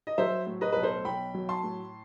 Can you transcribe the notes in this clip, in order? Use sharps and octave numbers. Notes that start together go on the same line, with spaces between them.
D#5
F#3 C5 E5
A2
B4 D#5
B1 B4
A4 C5
B1 G5 B5
F#3
A5 C6
A2